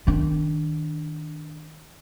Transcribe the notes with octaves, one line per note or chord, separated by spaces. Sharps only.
D#3 D4